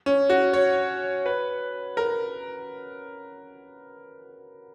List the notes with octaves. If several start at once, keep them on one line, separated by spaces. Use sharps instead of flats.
C#4
F#4
C#5
B4
A#4